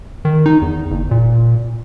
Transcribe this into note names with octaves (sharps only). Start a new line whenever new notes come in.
D#3
D#4
E2
F#1
A#2